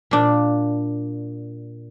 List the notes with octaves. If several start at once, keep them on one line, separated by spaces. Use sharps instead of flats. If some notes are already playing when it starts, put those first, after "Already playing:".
A#2 D4